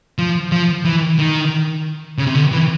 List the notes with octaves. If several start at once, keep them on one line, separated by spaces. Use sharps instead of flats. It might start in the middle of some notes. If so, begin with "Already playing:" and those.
F3
F3
E3
D#3
C#3
C3
D3
E3